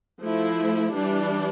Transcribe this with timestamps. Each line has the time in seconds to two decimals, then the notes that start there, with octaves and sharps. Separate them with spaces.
0.22 F3 A3 E4
0.94 E3 G3 D4